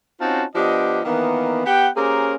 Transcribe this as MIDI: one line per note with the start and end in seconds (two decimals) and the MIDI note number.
0.21 0.44 60
0.21 0.44 61
0.21 0.44 63
0.21 0.44 65
0.21 0.44 66
0.21 0.44 81
0.55 1.00 53
0.55 1.00 59
0.55 1.00 62
0.55 1.00 67
0.55 1.00 75
1.05 1.62 51
1.05 1.62 52
1.05 1.62 58
1.05 1.62 59
1.66 1.88 59
1.66 1.88 67
1.66 1.88 78
1.66 1.88 79
1.96 2.34 58
1.96 2.34 61
1.96 2.34 67
1.96 2.34 68
1.96 2.34 70
1.96 2.34 72